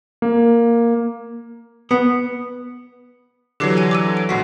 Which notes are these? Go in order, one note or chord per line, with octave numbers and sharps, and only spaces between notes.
A#3
B3
D3 E3 F#3 G4 D6 C7
G#5 D#7
D6 E6 D#7
D7
A#1 G#2 F#4 B6 C7